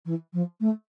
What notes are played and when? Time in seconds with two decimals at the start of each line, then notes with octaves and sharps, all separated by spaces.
0.06 E3
0.33 F3
0.61 A3